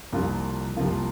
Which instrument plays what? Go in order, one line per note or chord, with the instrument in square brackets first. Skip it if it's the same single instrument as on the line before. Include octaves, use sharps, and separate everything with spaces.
[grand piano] C2 C3 F3 A#3 F4
C2 C3 F3 A#3 F4